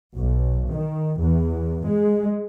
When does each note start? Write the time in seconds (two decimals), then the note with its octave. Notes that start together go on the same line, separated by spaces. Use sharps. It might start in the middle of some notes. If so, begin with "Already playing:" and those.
0.15 B1
0.69 D#3
1.20 E2
1.85 G#3